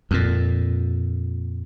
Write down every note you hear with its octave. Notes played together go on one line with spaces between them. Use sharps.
F2 A#2